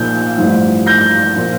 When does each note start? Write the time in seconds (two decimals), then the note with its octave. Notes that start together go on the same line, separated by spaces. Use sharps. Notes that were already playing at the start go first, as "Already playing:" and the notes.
Already playing: A#1 A#2 F3 G6
0.38 A1 G2 F3
0.86 G6 A#6
1.36 A#2 F3